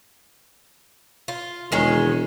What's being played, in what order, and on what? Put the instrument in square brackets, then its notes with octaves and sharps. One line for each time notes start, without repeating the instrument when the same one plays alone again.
[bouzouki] F4
[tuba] E1 [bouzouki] D#3 G#3 C#4